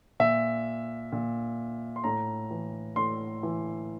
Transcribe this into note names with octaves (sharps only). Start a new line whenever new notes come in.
A#2 E5
A#2
C6
A2 A#5
E3
A2 C6
E3